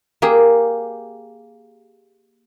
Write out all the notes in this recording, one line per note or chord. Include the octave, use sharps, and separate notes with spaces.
A#3 G4 G#4